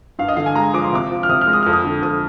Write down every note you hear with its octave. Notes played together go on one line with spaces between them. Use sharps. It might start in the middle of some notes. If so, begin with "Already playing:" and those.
G2 F5
D#5
D3 F5
G#5
G#3 A#5
F3 D6
C6
C3 D6
F3
F6
C3 D#6
F6
G#3
D#6
F2 F6
D#6
D3
F2 D#6